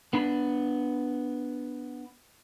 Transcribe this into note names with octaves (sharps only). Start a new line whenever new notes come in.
B3 D4 B5